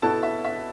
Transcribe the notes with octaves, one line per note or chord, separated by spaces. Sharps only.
B2 B3 E4 A4 A5
E5
E5